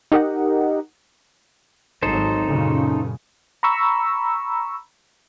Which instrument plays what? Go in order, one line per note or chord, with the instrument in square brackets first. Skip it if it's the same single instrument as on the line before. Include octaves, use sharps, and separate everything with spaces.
[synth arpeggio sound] D#4 G4 A#4 D#5 F#5
[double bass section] G#1 F#3 [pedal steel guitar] D#4 A4 C5
[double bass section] F#2 A#2 C#3
[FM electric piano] A#5 B5 C#6 E6